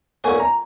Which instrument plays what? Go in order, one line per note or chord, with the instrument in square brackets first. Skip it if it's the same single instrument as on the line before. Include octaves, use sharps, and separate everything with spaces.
[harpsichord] B1 A#2 A#3 C#4 F#4 [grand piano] G#5
[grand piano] A#5